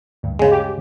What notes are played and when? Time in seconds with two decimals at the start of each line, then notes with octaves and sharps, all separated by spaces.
0.23 D2 G2
0.39 C#3 G#3
0.51 G4